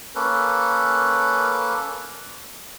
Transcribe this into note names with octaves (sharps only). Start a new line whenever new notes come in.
A#3 C#4 A4 B4